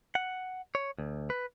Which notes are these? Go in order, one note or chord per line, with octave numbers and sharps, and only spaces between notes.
F#5
C#5
D2
B4